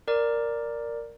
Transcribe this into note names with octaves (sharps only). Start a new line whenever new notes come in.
A#4 D5